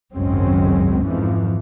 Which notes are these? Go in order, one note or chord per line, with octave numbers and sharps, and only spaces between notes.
G#1 C#2 F#2 G#3 C4 C#4
F2 G#2 E3 F3